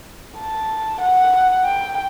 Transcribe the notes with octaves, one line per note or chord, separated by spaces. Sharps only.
A5
F#5
G5